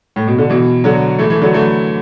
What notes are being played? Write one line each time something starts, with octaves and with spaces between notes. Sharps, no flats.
A2
B2
D3
B2 E3
D3 F#3
E3 A3
E3 A3
D3 F#3
E3 A3